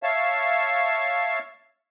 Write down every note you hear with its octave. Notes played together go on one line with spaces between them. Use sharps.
C#5 E5 F5 A5